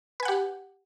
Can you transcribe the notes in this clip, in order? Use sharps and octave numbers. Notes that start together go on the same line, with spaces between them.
G4 B4 F#5 G#5